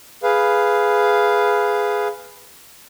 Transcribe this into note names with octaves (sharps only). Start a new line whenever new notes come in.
G#4 B4 F5